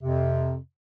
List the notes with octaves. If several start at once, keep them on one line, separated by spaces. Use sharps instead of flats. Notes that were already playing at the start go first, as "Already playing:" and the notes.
F2 C3